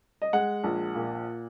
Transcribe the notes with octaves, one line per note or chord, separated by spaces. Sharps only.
D#5
G#3 F#5
A#1
A#2